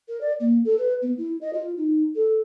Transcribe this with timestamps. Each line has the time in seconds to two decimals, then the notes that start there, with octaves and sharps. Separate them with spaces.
0.08 A#4
0.21 D5
0.40 A#3
0.65 A4
0.78 B4
1.02 B3
1.18 E4
1.41 D#5
1.53 F4
1.77 D#4
2.15 A4